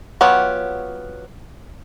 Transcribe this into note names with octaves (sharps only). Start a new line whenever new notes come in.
F#3 B3 F4 G4 C#5